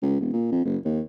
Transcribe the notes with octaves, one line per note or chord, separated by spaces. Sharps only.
C#2
E1
A#2
F2
F#1
D#2